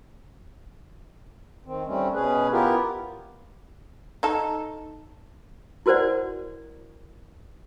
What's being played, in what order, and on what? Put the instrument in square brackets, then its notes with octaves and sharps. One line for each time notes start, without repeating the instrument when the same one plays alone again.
[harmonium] D#3 C4
G3 A3 C4 C#4
B2 C#4 G#4 B4
B3 E4 F4 G4 A#4
[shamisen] D#4 A4
[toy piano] E4 F#4 A#4 C5 D5 F#5